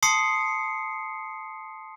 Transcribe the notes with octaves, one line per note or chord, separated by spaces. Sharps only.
A5 C6 D#6 C7 C#7